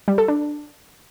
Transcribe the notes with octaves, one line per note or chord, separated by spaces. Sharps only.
G3
A4
D4